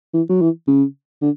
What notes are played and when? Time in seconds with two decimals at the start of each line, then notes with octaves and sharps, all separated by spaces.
0.14 E3
0.29 F#3
0.41 E3
0.67 C#3
1.22 D3